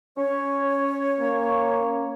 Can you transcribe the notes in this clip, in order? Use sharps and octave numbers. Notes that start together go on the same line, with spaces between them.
C#4 C#5
A#3